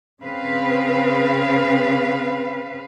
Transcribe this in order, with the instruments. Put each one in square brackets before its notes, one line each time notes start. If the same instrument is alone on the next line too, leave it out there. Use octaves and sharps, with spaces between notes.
[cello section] C#3 C4 B4 F5